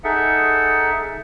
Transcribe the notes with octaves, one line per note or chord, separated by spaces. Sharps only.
D#4 G#4 A4 E5 F#5